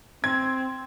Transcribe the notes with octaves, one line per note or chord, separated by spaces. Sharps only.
C4 G#6